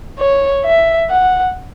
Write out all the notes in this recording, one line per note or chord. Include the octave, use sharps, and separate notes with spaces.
C#5
E5
F#5